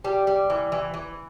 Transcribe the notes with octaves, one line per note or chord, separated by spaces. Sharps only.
G3
G3
E3
E3
E3